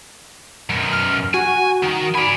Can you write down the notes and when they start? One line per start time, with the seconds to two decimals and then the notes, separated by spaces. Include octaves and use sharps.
0.70 F#2 B2
0.93 F6
1.34 F#4 G#5
1.83 D#3 D#4
2.15 D5 G#5 B5